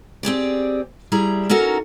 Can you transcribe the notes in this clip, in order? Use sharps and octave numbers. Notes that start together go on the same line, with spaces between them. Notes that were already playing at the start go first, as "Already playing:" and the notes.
C4 G4 G#4 D5
G3 E4 G#4 A#5
C#4 D#4 F#4 A4 A#4